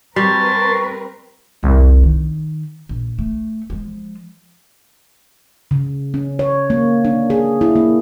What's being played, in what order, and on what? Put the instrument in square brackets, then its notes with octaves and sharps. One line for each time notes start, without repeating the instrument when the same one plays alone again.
[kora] G3 [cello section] C4 A#4 B4 [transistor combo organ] A5 C6 [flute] C#6
[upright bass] C2 F2
D#3
A#1
A3
F3 G#3
[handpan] C#3
C#4
C#5
A#3
D4
G#4
E4
A#3